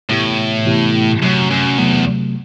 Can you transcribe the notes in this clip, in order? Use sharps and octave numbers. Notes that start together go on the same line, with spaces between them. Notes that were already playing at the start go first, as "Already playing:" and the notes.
A2 C3 E3 B3 E4 G4
C3 E3 B3 E4 G4
F#2 C3 F#3 A3
F#2
E2 C3 F#3 A3